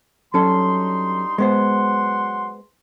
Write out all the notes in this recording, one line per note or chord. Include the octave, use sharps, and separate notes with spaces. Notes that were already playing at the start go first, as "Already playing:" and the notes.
G2 F#3 C#4 D#4 A4 C6
F#3 G#3 B3 C5 F#5 C6